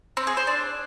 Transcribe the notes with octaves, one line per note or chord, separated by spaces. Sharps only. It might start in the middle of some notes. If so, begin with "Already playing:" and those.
C4
G#4
C5
D4